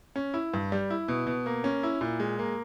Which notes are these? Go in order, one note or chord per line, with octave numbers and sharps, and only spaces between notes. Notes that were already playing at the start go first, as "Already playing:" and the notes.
C#4
E4
G2
G3
E4
B2
B2
A#3
C#4
E4
A#2
G#3
A#3